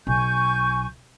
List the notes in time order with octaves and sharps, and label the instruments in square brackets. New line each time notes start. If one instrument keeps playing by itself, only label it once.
[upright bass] B1 [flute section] G#5 C#6 G6